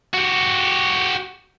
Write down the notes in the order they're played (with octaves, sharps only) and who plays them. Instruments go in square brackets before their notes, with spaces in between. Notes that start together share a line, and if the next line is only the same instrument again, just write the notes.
[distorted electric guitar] F#4 G4